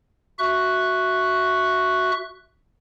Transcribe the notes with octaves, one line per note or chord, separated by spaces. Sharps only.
F#4 E5 C#6 F#6